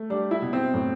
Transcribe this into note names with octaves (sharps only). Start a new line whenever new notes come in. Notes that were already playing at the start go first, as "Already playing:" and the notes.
Already playing: A3
G3 D4
E4
B2
C4
A2